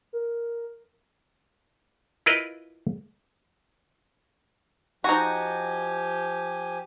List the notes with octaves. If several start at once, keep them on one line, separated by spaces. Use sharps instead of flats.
A#4
E4 F4 A#4 B4 D#5
F3 D#4 F#4 G4 G#5